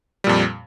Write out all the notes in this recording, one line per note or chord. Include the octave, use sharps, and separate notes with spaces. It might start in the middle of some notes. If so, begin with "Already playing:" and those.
F2 A#2 G3